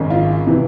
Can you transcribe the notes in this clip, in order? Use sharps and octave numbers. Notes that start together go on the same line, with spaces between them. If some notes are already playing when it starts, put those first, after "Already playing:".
Already playing: G#1 F#2 C#3
F4
C3 E3